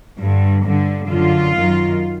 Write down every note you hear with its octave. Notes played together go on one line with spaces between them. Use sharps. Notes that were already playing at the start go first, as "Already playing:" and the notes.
G2 D3
G2 D3
F#2 D3 F4
F#2 D#3